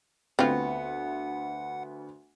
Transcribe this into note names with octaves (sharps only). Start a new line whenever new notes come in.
D2 B3 C4 F4 F#5